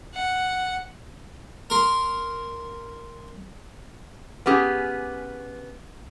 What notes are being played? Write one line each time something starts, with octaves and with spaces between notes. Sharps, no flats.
F#5
A#4 C6
B3 C#4 G4 G#4